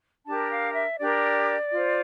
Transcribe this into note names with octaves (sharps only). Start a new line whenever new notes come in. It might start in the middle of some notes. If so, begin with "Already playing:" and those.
D4 G4 A#4 A5
F5
E5
D4 G4 A#4 D5
F4 C5